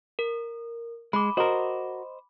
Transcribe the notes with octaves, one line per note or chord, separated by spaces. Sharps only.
A#4
G#3 B5 D6
F#4 A#4 C5 D#5